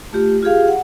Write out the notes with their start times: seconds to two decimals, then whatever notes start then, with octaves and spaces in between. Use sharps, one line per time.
0.13 A3 F4 G4
0.43 F4 G4 G#4 F5
0.68 F#5